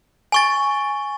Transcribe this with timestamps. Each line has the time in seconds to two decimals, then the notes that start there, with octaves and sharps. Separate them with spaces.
0.32 G#5 C#6 A6